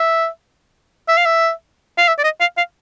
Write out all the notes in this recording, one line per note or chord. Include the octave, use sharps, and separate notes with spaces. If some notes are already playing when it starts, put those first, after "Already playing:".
Already playing: E5
E5
F5
E5
F5
E5
D5
D#5
F5
F5